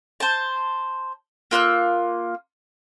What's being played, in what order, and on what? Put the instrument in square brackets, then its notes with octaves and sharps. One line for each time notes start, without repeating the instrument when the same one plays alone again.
[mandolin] C5 A5
A#3 F4 E6 F#6